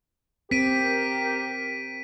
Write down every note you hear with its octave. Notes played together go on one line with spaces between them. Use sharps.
C4 G4 A#4 B6 D7 D#7